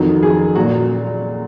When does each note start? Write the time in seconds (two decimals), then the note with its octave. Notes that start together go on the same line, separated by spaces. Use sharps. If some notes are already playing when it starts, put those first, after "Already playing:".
Already playing: F2 D#3 F#3
0.23 G#4
0.55 A#2 F#3 F#4